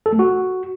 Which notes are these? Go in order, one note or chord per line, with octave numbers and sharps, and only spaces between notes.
A4
A3
F#4